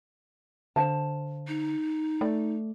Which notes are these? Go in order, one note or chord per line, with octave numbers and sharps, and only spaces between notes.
D3 C5 F5 A5
D#4
A3 D5